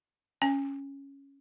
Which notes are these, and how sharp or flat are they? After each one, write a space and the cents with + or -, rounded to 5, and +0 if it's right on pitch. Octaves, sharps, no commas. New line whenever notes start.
C#4 +0 G#5 -35